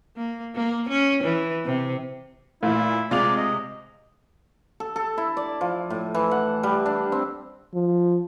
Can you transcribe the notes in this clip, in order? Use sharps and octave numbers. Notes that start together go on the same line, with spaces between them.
A#3
A#3
C#4
E3
C3
A#2 E3 A3 E4
C3 G#3 F4 D5 F7
D#5
A4
A4
E4
D5
F3
A2
E3
F#5
G3
D4
C4
F3